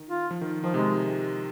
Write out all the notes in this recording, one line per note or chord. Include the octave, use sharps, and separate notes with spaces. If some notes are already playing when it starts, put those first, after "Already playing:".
Already playing: D#3
F4
F3
D#3
D#3 F3
C3 G#3